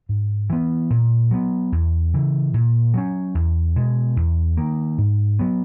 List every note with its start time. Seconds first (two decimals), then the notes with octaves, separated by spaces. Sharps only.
0.09 G#2
0.50 E3 B3
0.90 A#2
1.31 F#3 B3
1.72 E2
2.13 C#3 E3
2.54 A#2
2.94 F#3 C#4
3.35 E2
3.76 B2 G#3
4.16 E2
4.57 D#3 A#3
4.98 G#2
5.39 F#3 B3